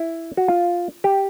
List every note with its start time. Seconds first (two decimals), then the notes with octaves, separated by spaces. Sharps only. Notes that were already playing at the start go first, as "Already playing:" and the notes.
Already playing: E4
0.37 F#4
0.48 F4
1.04 G4